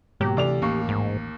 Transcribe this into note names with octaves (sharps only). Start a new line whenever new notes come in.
G#2 B2 F#3 A#3 G4
D2 C3 E3 D5 F7
A1 D#2 A#3 C#6
G#2